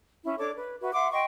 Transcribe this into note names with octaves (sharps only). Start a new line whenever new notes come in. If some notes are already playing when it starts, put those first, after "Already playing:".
C#4 E4
D4 A4 C#5 D6
B4
F#4 B4 E5
E5 F#5 C6 D6
D#5 G5 C6 C#6